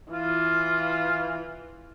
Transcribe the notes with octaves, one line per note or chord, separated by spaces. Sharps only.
E3 F4